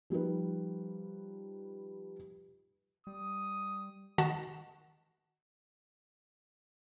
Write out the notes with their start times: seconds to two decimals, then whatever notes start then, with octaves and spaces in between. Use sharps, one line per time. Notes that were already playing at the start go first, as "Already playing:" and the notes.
0.10 F3 G3 D#4 B4
3.07 G3 D#6
4.18 D#3 F#4 F#5 A5 A#6 E7